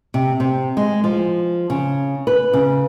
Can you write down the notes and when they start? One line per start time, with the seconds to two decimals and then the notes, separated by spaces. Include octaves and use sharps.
0.14 C3
0.40 C3
0.77 G#3
1.04 F3
1.70 C#3
2.27 B4
2.53 C#3